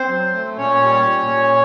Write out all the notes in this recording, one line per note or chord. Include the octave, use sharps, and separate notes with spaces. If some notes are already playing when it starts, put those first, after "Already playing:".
Already playing: C4 C5
F#3
A3
A#2 C#4 C#5
G3
A#2
A#2